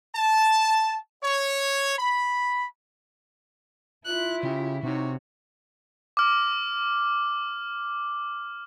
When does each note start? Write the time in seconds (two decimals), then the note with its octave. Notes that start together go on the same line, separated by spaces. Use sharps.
0.16 A5
1.24 C#5
1.99 B5
4.06 E4 F4 F#6
4.43 C#3 G4
4.83 C3 D#4 F#4 C#5
6.17 D6 F6